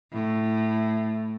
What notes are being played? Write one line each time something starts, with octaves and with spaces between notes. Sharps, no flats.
A2